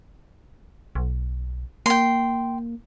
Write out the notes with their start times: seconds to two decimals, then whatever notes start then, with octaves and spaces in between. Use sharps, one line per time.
0.95 B1
1.86 A#3 G5 C6